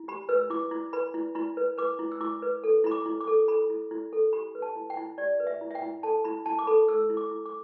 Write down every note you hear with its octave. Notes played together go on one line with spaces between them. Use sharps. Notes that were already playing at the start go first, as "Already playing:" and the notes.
Already playing: E4
G4 B5
B4 E6
E4 D6
E4
B4 B5
E4
E4 B5
B4
B4 D6
E4
E6
E4 D6
B4
A4
E4 B5
D6
E4
D6
A4
A4 B5
E4
E4
A4
G4 B5
B4
A5
E4
G5
E4
G4 D5
B4
E5
E4
E5
G5
E4
A4 A5
E4 B5
E4 A5
D6
A4 B5
A4 E6
E4
D6
E4
D6